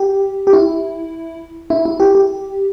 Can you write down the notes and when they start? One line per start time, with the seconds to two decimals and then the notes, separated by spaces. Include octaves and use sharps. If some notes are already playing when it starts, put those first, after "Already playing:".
Already playing: G4
0.47 G4
0.53 E4
1.70 E4
1.85 E4
2.00 G4
2.15 G4